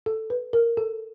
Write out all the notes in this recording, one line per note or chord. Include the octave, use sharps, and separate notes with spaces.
A4
B4
A#4
A4